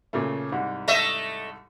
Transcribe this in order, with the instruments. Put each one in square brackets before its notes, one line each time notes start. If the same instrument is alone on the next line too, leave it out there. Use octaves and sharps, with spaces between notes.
[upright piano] A#2 C#3 A3
C2 G#2
[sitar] A3 D#5 E5